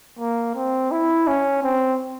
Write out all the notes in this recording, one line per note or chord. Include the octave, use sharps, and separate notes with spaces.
A#3
C4
E4
C#4
C4